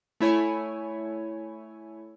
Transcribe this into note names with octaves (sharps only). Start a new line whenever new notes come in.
A3 E4 C#5 G#5